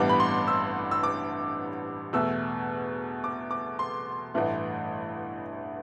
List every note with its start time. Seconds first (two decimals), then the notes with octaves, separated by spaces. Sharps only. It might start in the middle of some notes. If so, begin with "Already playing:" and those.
Already playing: A1 G2 E3 G3 B3 D6
0.09 B5
0.20 C6
0.48 E6
0.91 E6
1.03 D6
2.13 E2 B2 A3 E6
3.24 D6
3.51 D6
3.79 C6
4.34 A1 G2 E3 A3